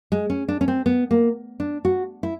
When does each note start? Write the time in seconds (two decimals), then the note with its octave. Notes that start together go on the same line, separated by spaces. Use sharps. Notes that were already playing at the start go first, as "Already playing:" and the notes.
0.12 G#3
0.30 C#4
0.48 D4
0.61 C#4
0.68 C4
0.86 B3
1.11 A#3
1.60 D4
1.85 F#4
2.23 E4